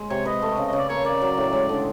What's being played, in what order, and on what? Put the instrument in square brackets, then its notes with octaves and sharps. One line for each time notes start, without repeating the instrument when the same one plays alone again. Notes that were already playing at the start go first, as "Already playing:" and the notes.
Already playing: [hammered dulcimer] G#3
[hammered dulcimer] C3 [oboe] C#5
[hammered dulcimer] B4 [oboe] D#5
[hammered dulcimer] A3
C#3
[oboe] D#5
[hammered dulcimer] C#3
[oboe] D5
[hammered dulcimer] A#3 [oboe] C#5
[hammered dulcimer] A#3 [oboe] D5
[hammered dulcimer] F#3
A2
G#3
D3